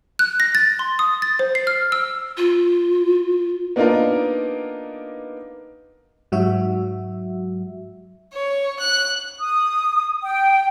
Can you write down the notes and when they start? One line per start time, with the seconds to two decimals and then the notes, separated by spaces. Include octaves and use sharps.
0.19 F#6
0.40 A#6
0.55 A6
0.79 C6
0.99 D#6
1.22 A6
1.39 C5
1.55 C7
1.67 F6
1.92 E6
2.37 F4
3.76 A#3 B3 D4 D#4 F4 A#4
6.32 G#2 F#3 F#4 E5
8.34 C#5
8.80 F#6
9.40 D#6
10.23 G5